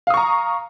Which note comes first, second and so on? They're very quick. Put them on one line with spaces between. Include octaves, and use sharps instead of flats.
F5 D#6 C#6 A#5